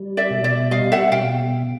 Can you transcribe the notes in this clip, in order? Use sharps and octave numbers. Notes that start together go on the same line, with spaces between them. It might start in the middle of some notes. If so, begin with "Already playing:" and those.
Already playing: G3
D5 E5
B2
D5 E5
G3 D#5 F5
E5 F#5
B2 F5 G5